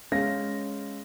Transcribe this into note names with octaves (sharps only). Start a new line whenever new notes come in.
G#3 C#4 F5 A#6